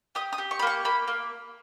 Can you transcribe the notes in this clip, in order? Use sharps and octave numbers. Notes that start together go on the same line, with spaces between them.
G4 D#6
D#6
G4
C#6
B5
A#3 C#6
A#3 B5
A#3